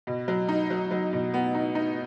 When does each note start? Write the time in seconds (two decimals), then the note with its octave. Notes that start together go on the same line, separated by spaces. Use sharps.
0.07 B2
0.28 F#3
0.48 D#4
0.70 F#3
0.91 F#3
1.13 B2
1.34 B3
1.55 D#4
1.75 D#4